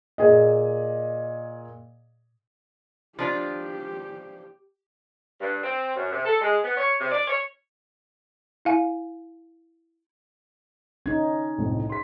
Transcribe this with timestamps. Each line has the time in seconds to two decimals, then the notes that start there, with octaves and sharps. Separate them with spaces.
0.18 A#2 G#4 D#5
3.19 F3 D4 F4 G4
5.41 G2
5.63 C4
5.96 F#2
6.12 C3
6.25 A4
6.41 G#3
6.64 B3
6.77 C#5
7.00 C3
7.11 D5
7.28 C#5
8.65 E4 F5 G#5
11.06 C#4 D#4 G#6
11.58 C2 F2 A2
11.89 C6 B6